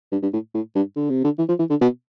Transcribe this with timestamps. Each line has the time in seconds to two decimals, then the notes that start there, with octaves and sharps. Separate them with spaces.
0.12 G2
0.22 G2
0.33 A2
0.54 A2
0.75 G2
0.96 D3
1.10 C3
1.24 D3
1.38 E3
1.49 F3
1.59 E3
1.70 D3
1.81 B2